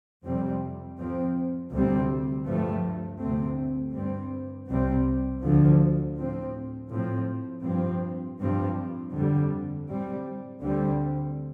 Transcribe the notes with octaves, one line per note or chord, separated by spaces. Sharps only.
F2 C3 G3 C4
F2 F3 C4
D2 C3 G3 C4
G2 F3 A3
D2 C3 A3 C4
G2 G3 C4
C2 C3 G3 C4
D2 D3 F3
A2 F3 C4
A2 F3 C4
G2 F3 C4
G2 F3 C4
F2 D3 G3
A2 G3 C4
D2 D3 G3 C4